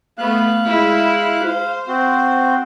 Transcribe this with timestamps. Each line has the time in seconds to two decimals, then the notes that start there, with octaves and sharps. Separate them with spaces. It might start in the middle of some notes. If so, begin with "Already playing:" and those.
0.18 A3 B3 F5 F#6
0.66 G#3 E4
1.46 C5 F5
1.88 C4 F#4